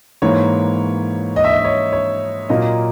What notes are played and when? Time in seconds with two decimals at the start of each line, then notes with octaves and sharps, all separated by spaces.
0.22 G#2 E3 A#3 C#5
1.36 D#5
1.44 E5
1.51 D#5
1.65 C#5
1.93 C#5
2.49 A#2 F#3 A#3 D#5